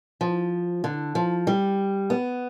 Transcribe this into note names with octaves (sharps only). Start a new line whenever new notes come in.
F3
D3
F3
G3
B3